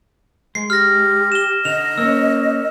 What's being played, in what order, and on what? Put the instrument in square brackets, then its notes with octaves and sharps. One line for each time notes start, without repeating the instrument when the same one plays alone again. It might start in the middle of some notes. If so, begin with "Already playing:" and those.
[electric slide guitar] G#3 [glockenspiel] C7
[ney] G4 [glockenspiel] F6 A#6
[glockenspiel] E7 G7
[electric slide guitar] D3 [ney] D#5 [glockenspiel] F7
[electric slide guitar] A#3 C#4 [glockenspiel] E6